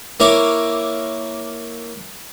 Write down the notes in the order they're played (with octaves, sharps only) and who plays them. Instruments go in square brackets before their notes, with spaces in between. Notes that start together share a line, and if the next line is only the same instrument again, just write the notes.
[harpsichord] A#3 E4 C#5 D6